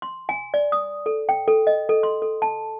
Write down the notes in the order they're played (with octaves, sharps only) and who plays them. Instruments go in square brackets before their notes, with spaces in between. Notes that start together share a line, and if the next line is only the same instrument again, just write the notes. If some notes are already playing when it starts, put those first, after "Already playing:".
[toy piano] C6
G#5
D5
D#6
A4
G5
A4
D#5
A4
C6
A4
A5